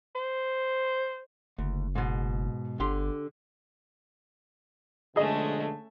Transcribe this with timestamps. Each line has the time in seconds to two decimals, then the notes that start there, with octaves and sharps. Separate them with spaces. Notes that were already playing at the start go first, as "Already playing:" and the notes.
0.15 C5
1.58 F#1 D2
1.95 G#2 B2
2.80 G1 D3 G4 C6
5.16 B2 D3 F3 G#3 A3 C#4 G#4 D#5